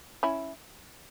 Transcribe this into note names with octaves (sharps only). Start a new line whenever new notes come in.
C#4 E4